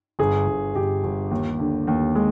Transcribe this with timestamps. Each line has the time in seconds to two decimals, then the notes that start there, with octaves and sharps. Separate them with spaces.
0.19 G1 G#4
0.47 G1
0.75 G1 G4
1.04 G1
1.31 D#2
1.59 D3
1.87 D#2
2.15 G#3